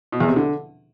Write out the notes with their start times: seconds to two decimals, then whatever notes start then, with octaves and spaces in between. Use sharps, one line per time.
0.12 B2
0.20 E2
0.28 C3
0.36 D3